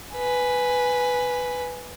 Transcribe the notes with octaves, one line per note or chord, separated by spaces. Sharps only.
B4 G#5